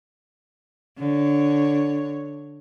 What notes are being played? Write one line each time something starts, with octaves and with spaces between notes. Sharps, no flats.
D3 C#5